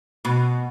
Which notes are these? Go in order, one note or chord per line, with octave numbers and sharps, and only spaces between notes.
B2